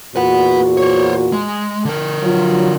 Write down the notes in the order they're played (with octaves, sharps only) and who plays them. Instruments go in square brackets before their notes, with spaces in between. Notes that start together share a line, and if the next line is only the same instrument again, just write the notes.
[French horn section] E2 A#2 F#4 [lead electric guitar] B4 F#5
[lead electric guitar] C5 C#5
G#3
D3 A#4
[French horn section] F#3 F4